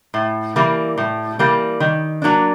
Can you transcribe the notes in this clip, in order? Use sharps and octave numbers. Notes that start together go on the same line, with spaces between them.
A2
E3 G3 A#3
A2
E3 G3 A#3
D#3
F#3 A#3 D4